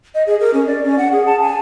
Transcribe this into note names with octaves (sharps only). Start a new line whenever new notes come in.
D#5
G#4
A#4
C#4
D5
C#4
F#5
G#4
A5
G#5